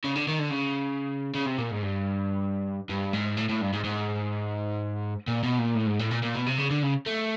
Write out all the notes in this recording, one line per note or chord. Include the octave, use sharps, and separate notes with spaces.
C#3
D3
D#3
D3
C#3
C#3
C3
A#2
G#2
G2
G2
G#2
A2
A2
G2
G#2
G#2
A#2
B2
A#2
A2
G#2
A2
A#2
A#2
B2
C3
C#3
D3
C#3
A3